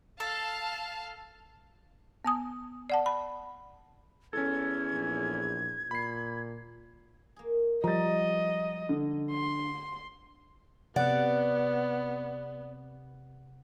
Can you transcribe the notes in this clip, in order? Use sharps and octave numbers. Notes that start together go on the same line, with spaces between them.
A4 F5 A5
B3 G#5 D#6
D5 F#5 A5
B5
E2 C#4 A4 G#6
A#1
A#2 B5 C7
A#3 G#4
F3 G3 G#3 D#5 A#5 A6
D3
C6
C3 B3 D5 F#5